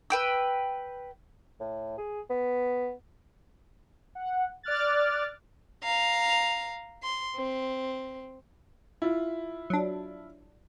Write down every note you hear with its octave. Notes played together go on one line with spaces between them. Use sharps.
B4 G5 E6
A2
G#4
B3
F#5
D5 D6 F6 F#6 A6
F5 A#5
C6
C4
E4 F4
F#3 D4